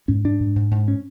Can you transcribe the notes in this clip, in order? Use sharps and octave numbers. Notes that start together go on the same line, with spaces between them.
G#2 C#4
G#2 D4
G#2
G#2
G#2
C#4